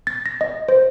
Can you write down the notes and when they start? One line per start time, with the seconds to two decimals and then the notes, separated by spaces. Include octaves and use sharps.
0.07 A6
0.26 A#6
0.41 D#5
0.69 C5